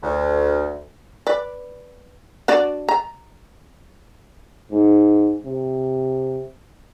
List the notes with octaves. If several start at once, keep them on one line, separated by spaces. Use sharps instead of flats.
D2
B4 D5
D4 F#4 D5
A#5
G#2
C3